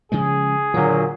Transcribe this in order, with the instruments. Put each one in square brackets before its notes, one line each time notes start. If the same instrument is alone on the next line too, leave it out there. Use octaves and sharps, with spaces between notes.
[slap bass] C#3 F3 G#3 [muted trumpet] G#4
[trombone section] A#2 F#3 [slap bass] D3 D#3